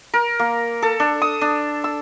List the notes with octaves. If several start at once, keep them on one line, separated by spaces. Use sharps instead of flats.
A#4
A#3
A4
D4
D#6
D4
E6